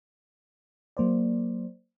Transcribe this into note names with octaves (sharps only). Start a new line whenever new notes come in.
F#3 A#3 C5 D5